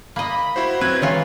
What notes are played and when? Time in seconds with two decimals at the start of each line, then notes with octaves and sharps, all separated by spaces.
0.16 A#3 D#5 B5
0.56 E4 F#4 C5
0.81 F#3 C4 B4 G#6
1.02 D#3 E3 G#3 F4 C#5